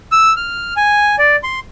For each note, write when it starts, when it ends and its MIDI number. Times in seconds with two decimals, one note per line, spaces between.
0.12 0.33 88
0.37 0.74 89
0.77 1.16 80
1.19 1.36 74
1.43 1.60 84